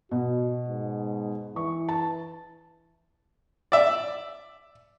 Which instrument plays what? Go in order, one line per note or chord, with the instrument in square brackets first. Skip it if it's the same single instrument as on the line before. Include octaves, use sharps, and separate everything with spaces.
[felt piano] B2 [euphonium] F#4
[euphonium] G#2
[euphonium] E3 [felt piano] C#6
[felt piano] A5
[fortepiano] D5 E5